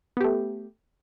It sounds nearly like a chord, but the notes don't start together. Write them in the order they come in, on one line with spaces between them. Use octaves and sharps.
B3 G4 A3